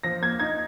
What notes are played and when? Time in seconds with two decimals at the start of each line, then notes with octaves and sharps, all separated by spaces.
0.03 F3 A#6
0.21 A#3 G#6
0.40 D#4 G#6